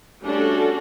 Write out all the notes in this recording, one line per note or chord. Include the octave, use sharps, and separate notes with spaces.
G3 A3 C#4 D4 F#4 A4